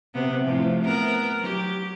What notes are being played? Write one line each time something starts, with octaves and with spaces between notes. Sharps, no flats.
C3 B3
A2 C3 F3
B3 A#4
F#3 G4